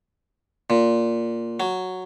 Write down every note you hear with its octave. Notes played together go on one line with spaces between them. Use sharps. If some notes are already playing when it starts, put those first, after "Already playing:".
A#2
F#3